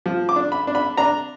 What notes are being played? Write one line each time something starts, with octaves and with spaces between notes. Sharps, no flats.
F3
D6
D4
B5
D4
B5
D4 A#5